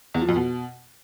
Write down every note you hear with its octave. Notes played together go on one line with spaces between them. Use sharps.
E2
F3
F2
B2